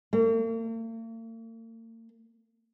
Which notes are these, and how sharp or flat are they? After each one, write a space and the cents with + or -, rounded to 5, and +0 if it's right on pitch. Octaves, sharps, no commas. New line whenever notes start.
A#3 -45